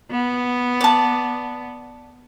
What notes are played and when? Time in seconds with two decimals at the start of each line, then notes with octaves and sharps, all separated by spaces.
0.11 B3
0.81 D5 A5